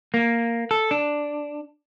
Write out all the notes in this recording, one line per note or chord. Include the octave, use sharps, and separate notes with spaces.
A#3
A4
D4